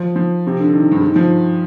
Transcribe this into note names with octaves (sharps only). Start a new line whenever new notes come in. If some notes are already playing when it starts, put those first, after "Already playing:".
Already playing: F3
F3
C3
D3
D#3
G2
G#2
F3